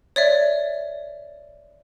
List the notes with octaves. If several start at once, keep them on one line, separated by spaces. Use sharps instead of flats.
C#5 D5 E5